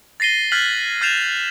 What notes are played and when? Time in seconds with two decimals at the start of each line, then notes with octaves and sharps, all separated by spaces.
0.20 A6 A#6 C7 D#7 G7
0.52 F6 F#6 G#6 A6 B6 F#7
1.01 F6 G6 A6 C7 E7 F7